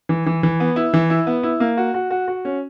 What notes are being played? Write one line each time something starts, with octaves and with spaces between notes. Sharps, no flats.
E3
E3
E3
B3
E4
E3
E4
B3
E4
A#3
F#4
F#4
F#4
F#4
C#4